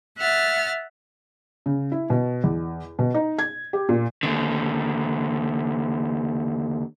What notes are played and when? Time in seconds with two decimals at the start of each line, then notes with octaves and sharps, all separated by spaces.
0.18 E5 F#5 F6 A6
1.66 C#3
1.92 E4
2.10 B2
2.44 E2
2.99 B2
3.14 D#4
3.39 G#6
3.73 G4
3.89 A#2
4.23 D#2 D3